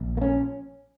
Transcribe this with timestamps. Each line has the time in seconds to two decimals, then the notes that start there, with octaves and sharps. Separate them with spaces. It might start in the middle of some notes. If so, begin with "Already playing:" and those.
Already playing: A#1
0.17 A#3
0.21 C#4